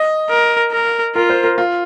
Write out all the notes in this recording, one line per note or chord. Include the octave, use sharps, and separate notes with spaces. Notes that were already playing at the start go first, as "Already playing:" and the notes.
Already playing: D#5
A#4
A#4
F4 A#4
C5
A#4
F4